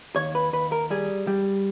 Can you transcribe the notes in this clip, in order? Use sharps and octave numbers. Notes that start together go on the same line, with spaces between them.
D#2 C#5
B4
D#2 B4
A#4
G3 G#4
G3